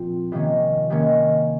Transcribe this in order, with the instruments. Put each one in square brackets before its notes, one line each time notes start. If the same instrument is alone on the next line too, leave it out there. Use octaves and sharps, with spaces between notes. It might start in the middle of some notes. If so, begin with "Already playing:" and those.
Already playing: [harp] A#2 F3 C4 F4
C3 D#3 A#3 C#4
C3 D#3 A#3 C#4